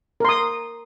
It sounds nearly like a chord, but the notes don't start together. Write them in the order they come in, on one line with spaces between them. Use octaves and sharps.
A#4 C6 D#6